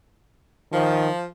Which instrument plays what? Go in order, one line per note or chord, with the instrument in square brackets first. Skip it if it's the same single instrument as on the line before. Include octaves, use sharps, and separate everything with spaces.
[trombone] D#3 [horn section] F3